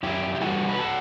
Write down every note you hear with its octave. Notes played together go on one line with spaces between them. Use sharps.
F#2 E4 G4
G4
E3 G3 F#4 A4
B4
F#4 A4